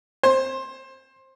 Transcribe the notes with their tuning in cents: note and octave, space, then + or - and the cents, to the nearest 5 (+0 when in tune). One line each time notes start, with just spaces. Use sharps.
C5 +20